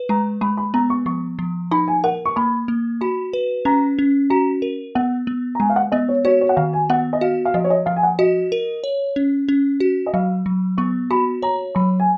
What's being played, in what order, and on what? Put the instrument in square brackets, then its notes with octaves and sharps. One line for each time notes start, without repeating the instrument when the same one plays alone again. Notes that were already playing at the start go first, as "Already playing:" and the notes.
Already playing: [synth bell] B4
[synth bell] G#3 [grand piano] A#5
[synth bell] G#3 [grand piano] B5
[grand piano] B5
[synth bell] B3 [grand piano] A#5
[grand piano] C#6
[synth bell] F3 [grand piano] C#6
[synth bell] F3
[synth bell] D#4 [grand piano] B5
[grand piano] G#5
[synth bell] A#4 [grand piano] F#5
[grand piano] C#6
[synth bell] A#3 [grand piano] B5
[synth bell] A#3
[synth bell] F#4 [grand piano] B5
[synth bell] B4
[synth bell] C#4 [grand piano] A#5
[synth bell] C#4
[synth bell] F#4 [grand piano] A#5
[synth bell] A#4
[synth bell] B3 [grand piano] F#5
[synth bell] B3
[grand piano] A#5
[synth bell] G#3 [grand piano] G#5
[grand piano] F5
F#5
[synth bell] B3 [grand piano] D#5
[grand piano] C#5
[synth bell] F#4 [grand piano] C#5
[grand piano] C#5
F#5
[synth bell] D#3 [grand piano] F5
[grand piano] G#5
[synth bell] B3 [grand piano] F#5
[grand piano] D#5
[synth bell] F#4 [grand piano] F5
[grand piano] F5
[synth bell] F3 [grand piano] D#5
[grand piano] C#5
D#5
[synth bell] F3 [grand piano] F5
[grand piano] G#5
F#5
[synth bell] F#4 [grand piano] D#5
[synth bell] A#4
C#5
C#4
C#4
F#4
[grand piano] D#5
[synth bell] F#3 [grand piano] F5
[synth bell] F#3
[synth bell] B3 [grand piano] C#6
[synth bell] F#4 [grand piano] B5
[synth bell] C#5 [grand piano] A#5
[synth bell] F#3 [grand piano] B5
[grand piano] G#5